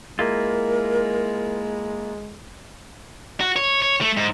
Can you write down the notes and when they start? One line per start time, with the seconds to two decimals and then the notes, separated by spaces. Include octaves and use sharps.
0.19 G#3 A#3 E4 F4 A#4
3.40 F#4
3.56 C#5
3.82 C#5
4.01 A3
4.17 G#2